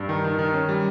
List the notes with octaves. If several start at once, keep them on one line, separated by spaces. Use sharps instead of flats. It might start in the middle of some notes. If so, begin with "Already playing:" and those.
Already playing: G2
D#3
D#3
D#3
C#4
G3